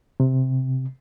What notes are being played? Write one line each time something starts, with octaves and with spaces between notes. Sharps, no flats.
C3